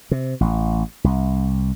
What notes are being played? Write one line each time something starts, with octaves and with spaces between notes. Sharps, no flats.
C3
A1
C2